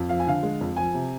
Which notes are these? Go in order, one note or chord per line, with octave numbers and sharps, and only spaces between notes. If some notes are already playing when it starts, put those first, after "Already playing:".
Already playing: F2
F3 F5
G#5
D3 F5
G#3
F2
F3 G#5
C3